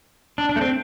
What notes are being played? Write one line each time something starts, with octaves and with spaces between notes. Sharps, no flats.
D4
D4
A3
C4